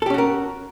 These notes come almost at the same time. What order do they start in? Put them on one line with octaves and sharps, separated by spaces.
A4 G4 C#4 F#4 A#4